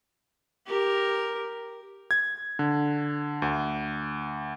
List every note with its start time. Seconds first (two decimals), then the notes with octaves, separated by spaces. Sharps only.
0.67 G4 A#4
2.11 G#6
2.59 D3
3.42 D2